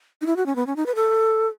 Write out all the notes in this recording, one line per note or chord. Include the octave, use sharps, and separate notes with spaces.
D#4
E4
F#4
C#4
B3
C#4
D#4
B4
A4